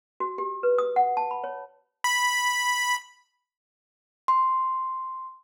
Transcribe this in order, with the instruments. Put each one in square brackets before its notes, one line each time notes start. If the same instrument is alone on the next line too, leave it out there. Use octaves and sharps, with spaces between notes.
[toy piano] F#4
G4
B4
D#6
F#5
A5
B5
C#5
[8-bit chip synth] B5
[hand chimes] C6